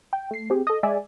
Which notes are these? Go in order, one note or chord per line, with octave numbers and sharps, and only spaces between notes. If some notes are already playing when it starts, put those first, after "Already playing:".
G5
A3 C7
C4 G4 G#4
A4 D#5
G#3 D5 E5 G#5